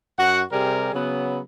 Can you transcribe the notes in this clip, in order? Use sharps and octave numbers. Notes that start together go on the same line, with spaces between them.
F#2 F#4 F#5
C3 G3 G#4 A#4
C#3 F#3 B3